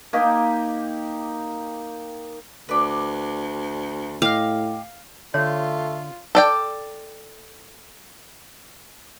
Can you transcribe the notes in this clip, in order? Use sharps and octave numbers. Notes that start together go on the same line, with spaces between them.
A#3 D#4 G4
D2 B4 D5
A2 G4 D#5 F5 F6
D3 A3 F4 C#5
A4 D5 G5